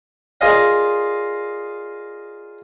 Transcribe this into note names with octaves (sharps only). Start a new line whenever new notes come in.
F4 G#4 A#4 D5 D#5 F5